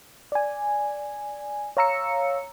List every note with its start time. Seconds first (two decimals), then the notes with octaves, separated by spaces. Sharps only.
0.32 D5 G#5
1.77 C#5 F5 A#5 E6 C#7